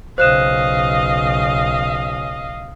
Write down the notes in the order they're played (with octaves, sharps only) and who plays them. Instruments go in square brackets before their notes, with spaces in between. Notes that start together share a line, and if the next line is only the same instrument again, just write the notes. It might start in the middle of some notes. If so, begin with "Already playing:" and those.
[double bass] B1 C#3 [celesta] C5 F#6 E7 [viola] D#5 F5